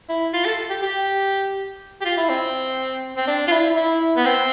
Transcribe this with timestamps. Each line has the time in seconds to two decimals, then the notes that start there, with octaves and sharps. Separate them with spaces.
0.09 E4
0.33 F4
0.45 A4
0.70 G4
0.82 G4
2.01 G4
2.05 F4
2.17 E4
2.29 C4
3.17 C4
3.27 D4
3.47 F4
3.52 E4
3.76 E4
4.16 B3
4.25 C4